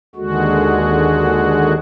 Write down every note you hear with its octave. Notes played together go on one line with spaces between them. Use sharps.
D#2 D3 G#3 F#4